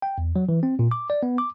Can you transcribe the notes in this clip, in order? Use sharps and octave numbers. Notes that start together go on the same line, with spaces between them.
G5
E2
F#3
E3
C4
A#2
D6
D5
B3
D6